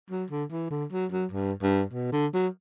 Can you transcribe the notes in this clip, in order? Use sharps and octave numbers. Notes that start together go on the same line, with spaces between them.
F#3
D3
E3
D3
F#3
F#3
G2
G2
B2
D3
F#3